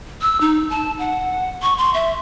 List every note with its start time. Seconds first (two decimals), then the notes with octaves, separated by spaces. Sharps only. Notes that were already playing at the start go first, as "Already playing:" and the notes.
0.22 E6
0.41 D#4
0.70 A5
0.99 F#5
1.62 C#6
1.78 C6
1.94 E5